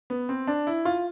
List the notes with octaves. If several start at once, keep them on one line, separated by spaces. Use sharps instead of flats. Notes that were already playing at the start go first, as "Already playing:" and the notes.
B3
C4
D4
E4
F4